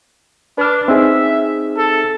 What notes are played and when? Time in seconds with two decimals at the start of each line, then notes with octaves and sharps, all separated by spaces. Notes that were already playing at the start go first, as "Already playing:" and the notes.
0.58 D4 B4 F6
0.88 C4 D#4 G#4 E5
1.77 A4